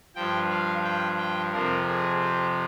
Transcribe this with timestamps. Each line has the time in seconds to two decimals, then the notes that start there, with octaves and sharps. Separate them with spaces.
0.15 G2 F3 G5
0.50 F5
0.84 G5
1.18 G5
1.52 F2 C3 F3 A#4
1.88 G#4
2.21 G4